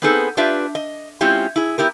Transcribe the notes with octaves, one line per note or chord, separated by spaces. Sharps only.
B3 C4 D#4 G#4 A4 B4
D4 F4 G4 B4 E5
D#5
G#3 C4 C#4 E4 F4 G4
E4 G#4
B3 E4 G4 A#4